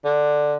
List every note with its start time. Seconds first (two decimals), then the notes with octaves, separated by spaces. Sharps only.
0.05 D3